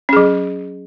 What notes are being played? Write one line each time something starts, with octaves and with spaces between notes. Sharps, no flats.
F#3 C#4 G#4